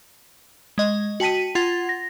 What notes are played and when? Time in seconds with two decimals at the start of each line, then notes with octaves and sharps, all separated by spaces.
0.78 G#3 D#5
1.20 F#4 G5 A5 B6 D#7
1.55 F4 F#5 C6 G#6 A6
1.89 A#6